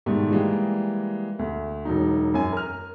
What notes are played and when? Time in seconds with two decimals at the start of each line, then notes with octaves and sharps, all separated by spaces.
0.06 G#2 B2 D#3 G3 A3
0.31 E3 G3 G#3 A#3
1.39 D2
1.85 E1 F#3 D#4
2.34 F#2 G#5
2.53 A#4 F6